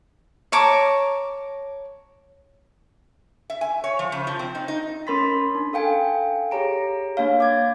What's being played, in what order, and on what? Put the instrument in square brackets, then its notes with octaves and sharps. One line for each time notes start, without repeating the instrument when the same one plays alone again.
[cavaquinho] C#5 A5 A#5 D6
[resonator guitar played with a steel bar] E5
G#5
C#5
F3
C#3
F3
C4
D#4
D#4
[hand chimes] C#4 A#4 B5 C6 A6 B6
D4
A4 F5 G5 G#5
G4 G#4 C#5 A#5 D7
A#3 D4 C#5 F5
D6 G#6 A6